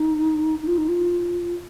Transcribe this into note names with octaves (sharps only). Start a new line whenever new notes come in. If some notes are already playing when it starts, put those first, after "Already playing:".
Already playing: D#4
D#4
F4
D#4
F4